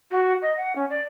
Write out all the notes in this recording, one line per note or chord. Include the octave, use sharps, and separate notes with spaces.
F#4
D#5
F#5
C#4
D5